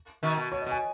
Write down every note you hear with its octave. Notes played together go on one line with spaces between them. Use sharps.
B2 D#3
B2
B2 C#5
D#5
B2
G#5